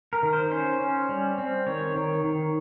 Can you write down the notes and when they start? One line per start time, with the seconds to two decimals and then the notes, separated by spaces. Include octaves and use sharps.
0.13 A#4
0.23 D#3
0.33 C5
0.51 C#4 C5
0.80 C#4
1.09 G3
1.38 C4
1.66 D#3 C#5
1.96 D#3
2.24 D#3